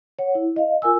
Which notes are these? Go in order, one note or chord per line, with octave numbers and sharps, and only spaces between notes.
C#5 F#5
E4
D#5 F5
F4 A#4 G#5 E6